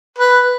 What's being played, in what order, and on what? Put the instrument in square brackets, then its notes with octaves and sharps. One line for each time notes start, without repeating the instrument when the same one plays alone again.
[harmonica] B4